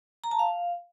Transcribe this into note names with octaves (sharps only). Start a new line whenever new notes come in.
A#5
A5
F5